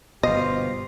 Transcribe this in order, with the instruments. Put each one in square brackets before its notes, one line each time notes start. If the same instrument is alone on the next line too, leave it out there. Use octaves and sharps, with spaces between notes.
[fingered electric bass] G1 B2 [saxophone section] F4 G4 C5 [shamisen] D#5